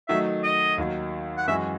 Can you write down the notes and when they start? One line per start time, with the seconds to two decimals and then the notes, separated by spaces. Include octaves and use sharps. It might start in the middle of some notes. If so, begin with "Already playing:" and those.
0.08 D#3 F#3 A3 D#4 E5
0.43 D#5
0.78 D#2 D#3 F#3
1.37 F#5
1.48 F#2 E3 G#3 C#4 F#4 E5